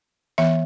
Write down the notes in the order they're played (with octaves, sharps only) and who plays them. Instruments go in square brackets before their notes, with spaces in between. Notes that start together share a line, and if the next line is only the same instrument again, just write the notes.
[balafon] E3 B3 E5